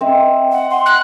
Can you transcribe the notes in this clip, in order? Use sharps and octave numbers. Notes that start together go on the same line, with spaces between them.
C4 D#5 E5
F#5
C6
F#6